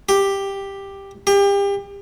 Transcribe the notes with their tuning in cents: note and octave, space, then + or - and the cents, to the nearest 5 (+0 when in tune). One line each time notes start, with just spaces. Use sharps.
G4 +5
G4 +30